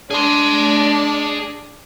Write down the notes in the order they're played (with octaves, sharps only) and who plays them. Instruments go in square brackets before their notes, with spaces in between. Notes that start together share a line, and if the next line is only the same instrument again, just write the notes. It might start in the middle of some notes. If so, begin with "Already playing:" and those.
[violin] D4 [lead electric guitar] G#4 C6